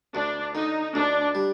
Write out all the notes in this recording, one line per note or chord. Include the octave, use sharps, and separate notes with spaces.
D2 D4
D3 D#4
D2 D4
G3